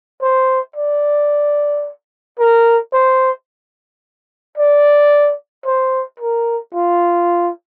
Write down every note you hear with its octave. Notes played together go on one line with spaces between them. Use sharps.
C5
D5
A#4
C5
D5
C5
A#4
F4